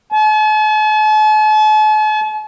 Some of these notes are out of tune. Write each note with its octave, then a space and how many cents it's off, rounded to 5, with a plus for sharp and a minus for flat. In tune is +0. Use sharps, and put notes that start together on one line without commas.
A5 -45